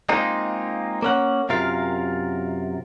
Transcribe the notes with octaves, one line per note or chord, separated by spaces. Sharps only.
G#3 A#3 C4 D#4 F4
A#3 C#4 F#5
F#2 C3 F4 A#4 F5